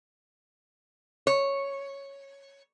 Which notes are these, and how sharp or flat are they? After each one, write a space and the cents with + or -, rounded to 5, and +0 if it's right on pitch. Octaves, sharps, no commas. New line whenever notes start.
C#5 -5